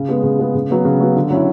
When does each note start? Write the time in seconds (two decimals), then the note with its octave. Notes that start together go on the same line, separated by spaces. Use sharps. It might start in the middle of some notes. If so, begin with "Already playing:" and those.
Already playing: C#3
0.09 G#3 B3
0.23 C#3
0.39 G#3 B3
0.55 C#3
0.70 F#3 B3
0.85 C#3
1.01 F#3 B3
1.16 D3
1.30 F#3 C#4 E4